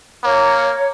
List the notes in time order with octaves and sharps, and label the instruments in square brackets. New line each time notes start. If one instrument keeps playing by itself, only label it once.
[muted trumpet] A#3 [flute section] C#5